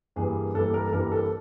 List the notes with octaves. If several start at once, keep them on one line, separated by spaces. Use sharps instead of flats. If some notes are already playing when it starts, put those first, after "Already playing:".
G2 E3 G3 A#3 G#4
G2 E3 G3 A#3 A4
A#4
A4
G2 E3 G3 A#3 A#4
A4